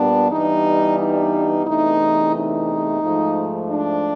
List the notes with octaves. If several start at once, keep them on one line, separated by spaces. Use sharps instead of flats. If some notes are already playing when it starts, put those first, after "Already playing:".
Already playing: A#2 G3 B3 D4
G2 E3 G3 B3 D4 D#4
D#4
E2 C3 E3 A3 D4 D#4
D#4
G#2 F3 A3
D4